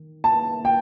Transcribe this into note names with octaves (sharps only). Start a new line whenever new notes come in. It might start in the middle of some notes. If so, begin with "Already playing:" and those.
Already playing: D#3
A5
G5